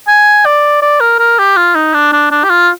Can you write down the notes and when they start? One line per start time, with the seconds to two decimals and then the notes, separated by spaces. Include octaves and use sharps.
0.08 G#5
0.46 D5
0.82 D5
1.01 A#4
1.19 A#4
1.39 G4
1.57 F4
1.75 D#4
1.94 D4
2.13 D4
2.31 D4
2.44 G4
2.50 F4